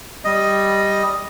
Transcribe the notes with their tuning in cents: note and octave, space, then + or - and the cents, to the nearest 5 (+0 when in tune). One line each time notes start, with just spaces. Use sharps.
G3 +0 D#5 +0